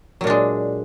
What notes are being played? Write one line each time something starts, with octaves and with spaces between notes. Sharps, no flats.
A#2 F#3 G#3 D4